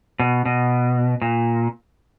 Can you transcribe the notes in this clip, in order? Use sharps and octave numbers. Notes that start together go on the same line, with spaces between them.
B2
B2
A#2